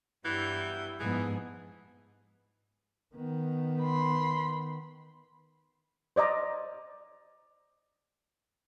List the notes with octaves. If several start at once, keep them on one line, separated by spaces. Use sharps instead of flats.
G2 E3 F#3 G3 B3 E4 G6
G#2 E3 F3 B3 G#4
D#3 B3
B5 C6
C5 D5 D#5 A#5